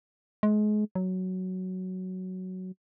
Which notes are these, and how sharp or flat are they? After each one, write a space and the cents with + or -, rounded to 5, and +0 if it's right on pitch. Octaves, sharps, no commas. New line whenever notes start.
G#3 +30
F#3 +5